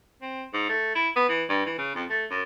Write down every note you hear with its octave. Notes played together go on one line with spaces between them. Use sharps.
C4
G#2
A3
E4
B3
E3
G2
E3
C#3
F2
A3
F#2